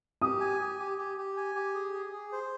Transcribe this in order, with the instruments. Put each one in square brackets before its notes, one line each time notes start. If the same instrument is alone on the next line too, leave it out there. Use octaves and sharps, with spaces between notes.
[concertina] G4 [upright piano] D#6
[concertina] G#5
G4
G4
G4
G4
G#5
G4
G#4
G#4
G#4
C5